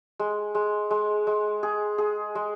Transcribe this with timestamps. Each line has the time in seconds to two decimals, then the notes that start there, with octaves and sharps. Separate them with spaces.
0.19 G#3
0.55 G#3
0.90 G#3
1.27 G#3
1.63 G#4
1.98 G#4
2.35 G#3